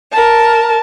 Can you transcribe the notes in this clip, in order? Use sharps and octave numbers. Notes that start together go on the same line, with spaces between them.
A#4 A5